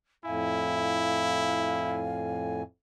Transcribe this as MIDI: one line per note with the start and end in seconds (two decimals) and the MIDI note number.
0.25 2.62 41
0.25 2.62 45
0.25 2.03 64
0.25 2.61 77
0.25 2.62 80